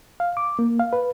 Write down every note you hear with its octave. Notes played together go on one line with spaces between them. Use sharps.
F5
D6
A#3
F5
B4